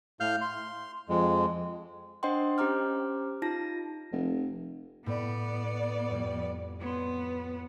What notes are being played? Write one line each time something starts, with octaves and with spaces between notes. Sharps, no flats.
A2 F5 F6 G6
C6
F2 G#3
D4 C5 D#5 F#5 G5 C6
C#4 G4 C5 A#5 D6 F6
D#4 F4 A5 A#6
F1
A2 B3 D5
F2 G3
B3 C#5 C6